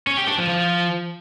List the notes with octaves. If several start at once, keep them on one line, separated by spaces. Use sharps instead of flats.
C#4
G4
D4
F3
F3